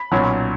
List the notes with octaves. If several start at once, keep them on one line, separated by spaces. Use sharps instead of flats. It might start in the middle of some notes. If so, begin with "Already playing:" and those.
Already playing: B5
B1 A#2 F#3 C#4